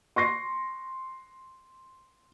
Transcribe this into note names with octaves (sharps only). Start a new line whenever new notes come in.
C6 C#6 A#6 C7